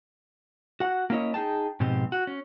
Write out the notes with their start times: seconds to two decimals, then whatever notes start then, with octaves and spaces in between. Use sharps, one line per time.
0.80 F#4 F#5
1.10 A#3 C#4 E4 C#5 D#5
1.34 D#4 G#4 G5 A5
1.80 G#2 B2 F3 C4 G4
2.12 F#4
2.27 C#4